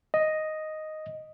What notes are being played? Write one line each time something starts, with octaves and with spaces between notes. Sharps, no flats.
D#5